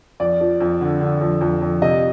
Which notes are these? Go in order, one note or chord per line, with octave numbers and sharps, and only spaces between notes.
F2 D5
F3
F2
D3
D3
F2
F2
F2
C3 D#5